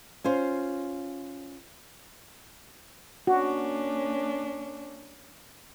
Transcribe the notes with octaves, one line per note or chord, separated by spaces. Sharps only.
C#4 F4 C5
A#3 C#4 D4 F#4